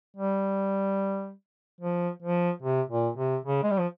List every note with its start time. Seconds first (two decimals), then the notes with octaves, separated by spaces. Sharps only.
0.17 G3
1.81 F3
2.22 F3
2.63 C3
2.90 A#2
3.18 C3
3.46 C#3
3.63 G#3
3.71 G3
3.80 F3